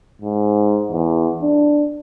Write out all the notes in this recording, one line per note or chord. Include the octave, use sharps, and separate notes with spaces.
G#2
E2
D4